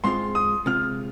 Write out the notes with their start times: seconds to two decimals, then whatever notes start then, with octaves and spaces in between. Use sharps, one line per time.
0.04 G#2 G#3 C4 F4 C6
0.35 D#6
0.66 C3 G#3 F4 F6